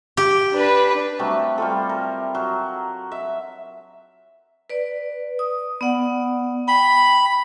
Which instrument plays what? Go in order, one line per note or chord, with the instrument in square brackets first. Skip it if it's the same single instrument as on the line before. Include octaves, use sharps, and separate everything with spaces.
[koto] G4
[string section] D4 B4
[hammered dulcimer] C3 F#3 G3 A3
G3 F4 A4
A#4
F#3
E5
[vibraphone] B4 D5
D#6
B3 D5 F#5
[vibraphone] G5 [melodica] B5